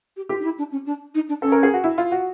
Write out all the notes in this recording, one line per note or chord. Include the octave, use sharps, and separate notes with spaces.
G4
F4 G4
D#4
E4
D4
C#4
D4
D#4
D4
C#4 A4
A#4
G#4
F#4
E4
F4
F#4